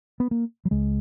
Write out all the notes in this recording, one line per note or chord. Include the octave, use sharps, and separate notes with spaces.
B3
A#3
F#3
C#2 C#3 G#3